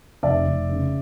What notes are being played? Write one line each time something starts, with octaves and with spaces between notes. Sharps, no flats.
F1 D5 E5
F1
C#3